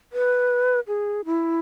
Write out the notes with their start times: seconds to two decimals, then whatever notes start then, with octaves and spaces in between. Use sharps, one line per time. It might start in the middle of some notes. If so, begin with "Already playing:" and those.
0.13 B4
0.88 G#4
1.25 E4